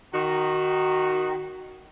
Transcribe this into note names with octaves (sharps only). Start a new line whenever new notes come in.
D#3 F#4